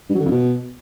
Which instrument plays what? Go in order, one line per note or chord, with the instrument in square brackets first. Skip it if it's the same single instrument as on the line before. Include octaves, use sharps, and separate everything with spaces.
[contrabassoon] G2
F#3
D3
F2
B2